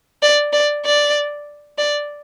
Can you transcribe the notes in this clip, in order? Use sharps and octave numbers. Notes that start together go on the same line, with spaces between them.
D5
D5
D5
D5